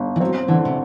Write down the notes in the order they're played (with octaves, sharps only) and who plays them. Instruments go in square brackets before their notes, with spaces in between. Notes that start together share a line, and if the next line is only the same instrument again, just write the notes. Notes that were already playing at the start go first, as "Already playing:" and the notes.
Already playing: [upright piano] G1
[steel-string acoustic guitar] E3
[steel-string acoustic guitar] F#3 [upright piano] C4
[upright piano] D3 [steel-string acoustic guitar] E3
[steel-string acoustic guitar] C3